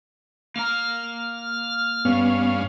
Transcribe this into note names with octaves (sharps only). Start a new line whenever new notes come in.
A#3 A#5 F6
G2 B3 C#4 F5